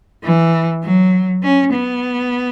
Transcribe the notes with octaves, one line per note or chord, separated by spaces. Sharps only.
E3
F#3
C#4
B3